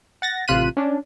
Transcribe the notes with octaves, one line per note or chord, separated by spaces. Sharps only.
F#5 A6 A#6
A1 C3 F4 F#6 B6 D#7
C#4 D4